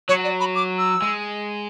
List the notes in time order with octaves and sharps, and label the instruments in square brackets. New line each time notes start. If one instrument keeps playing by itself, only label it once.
[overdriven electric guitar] F#3 [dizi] C#5
[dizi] D5
B5
D6
E6
[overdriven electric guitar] G#3